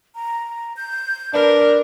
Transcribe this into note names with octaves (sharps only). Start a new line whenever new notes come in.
A#5
G6
D4 A#4 B4